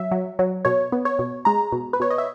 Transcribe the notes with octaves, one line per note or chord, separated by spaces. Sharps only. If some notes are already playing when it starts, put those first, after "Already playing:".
Already playing: F#3 E5
F#3
F#3
B2 C#5
B3
C#5
B2
G#3 A#5
B2
B4
B2 C#5
D#5
E5